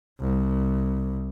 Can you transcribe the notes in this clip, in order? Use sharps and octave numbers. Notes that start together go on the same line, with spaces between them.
C2